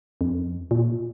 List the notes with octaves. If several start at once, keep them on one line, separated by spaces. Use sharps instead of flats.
F2
A#2